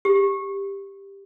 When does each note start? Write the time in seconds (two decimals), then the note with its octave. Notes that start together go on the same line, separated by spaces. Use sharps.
0.05 G4